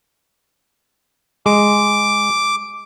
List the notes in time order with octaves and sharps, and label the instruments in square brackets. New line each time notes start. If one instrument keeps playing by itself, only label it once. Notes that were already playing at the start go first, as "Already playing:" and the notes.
[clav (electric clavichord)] G#3 [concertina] D6